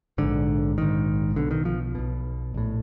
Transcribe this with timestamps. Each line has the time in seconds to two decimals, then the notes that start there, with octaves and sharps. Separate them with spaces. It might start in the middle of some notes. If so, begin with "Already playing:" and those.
0.18 A#1 G#2 D3
0.78 A#1 G#2 D#3
1.36 B1 B2 D3
1.51 D#3
1.65 F3
1.95 B1 B2
2.54 A#1 A2